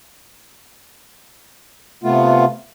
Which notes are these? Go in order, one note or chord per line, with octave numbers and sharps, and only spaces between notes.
C3 A3 B3 F4